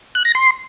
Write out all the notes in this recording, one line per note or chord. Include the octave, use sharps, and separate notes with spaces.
F#6
A#6
C6